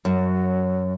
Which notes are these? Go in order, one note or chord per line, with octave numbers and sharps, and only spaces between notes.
F#2 F#3